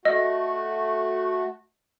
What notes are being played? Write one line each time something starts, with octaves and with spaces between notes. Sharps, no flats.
A3 F#4 D#5